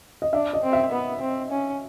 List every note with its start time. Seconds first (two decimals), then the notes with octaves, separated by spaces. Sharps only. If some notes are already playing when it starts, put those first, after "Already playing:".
0.22 D#5
0.33 D4 E5
0.53 D#5
0.63 C4
0.73 E5
0.92 B3
1.21 C4
1.51 C#4